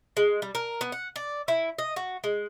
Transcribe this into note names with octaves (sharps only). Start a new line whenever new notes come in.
G#3
G3
A#4
B3
F#5
D5
E4
D#5
F#4
G#3